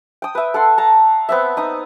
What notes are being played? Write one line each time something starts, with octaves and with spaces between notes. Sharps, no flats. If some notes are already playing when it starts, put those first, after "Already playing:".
G5 D#6
B4 E5
A4 F#5 C6
A5 A#5
B3 C4 E5
D#4 D#6